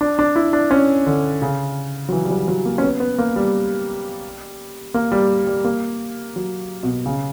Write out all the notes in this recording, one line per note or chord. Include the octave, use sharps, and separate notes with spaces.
D4
D4
E4
D4
C#4
D3
C#3
F#3
E3
G3
F#3
F#3
A#3
C#4
B3
B3
A#3
G3
A#3
G3
G3
A#3
F#3
B2
C#3